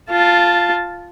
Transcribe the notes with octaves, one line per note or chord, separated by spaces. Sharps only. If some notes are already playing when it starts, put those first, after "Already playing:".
F4 A5